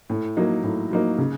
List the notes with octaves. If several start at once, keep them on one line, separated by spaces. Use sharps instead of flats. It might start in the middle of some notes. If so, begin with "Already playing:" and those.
A2
F#3 A#3 D#4
A2
F#3 A#3 D#4
C#3